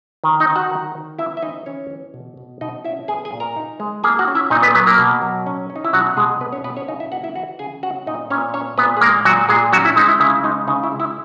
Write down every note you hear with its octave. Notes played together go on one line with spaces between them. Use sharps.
D#3
D#4 D#5
D#3
F#4 F#5
D#3
D#3
B3 E4 E5
E5
E3 D#4 D#5
E3 C#4 C#5
E3
B2
B2
B2 D#4 D#5
C#4 E4 E5
B3 G#4 G#5
G#4 G#5
A#2
A#4 A#5
D#4
G#3
A#3 G#4 G#5
F#4 F#5
C#4
E4 E5
A#2 D#4 D#5
B3 B4
F#3 B3 B4
A#3 A#4
B2
F#3
C#4
C#4
D#4
E4
B2 F#3 F#4
B2 G#3 G#4
B2 B3 B4
C#4 C#5
B2 B3 B4
C#4 C#5
C#3 D#4 D#5
E4 E5
A#3 F#4 F#5
E4 E5
E3 F#4 F#5
C#3 G#4 G#5
C#4 F#4 F#5
A#2 D#4 D#5
A#2 C#4 C#5
C#4 C#5
A#2 B3 B4
G#4
G#3 A#3 A#4
A#2 F#3 F#4
A#2 G#3 G#4
F#3 C#4 F#4
E4
G#3 D#4
E4
C#3 E4
G#3 D#4
C#3 D#4
E4
G#3
E4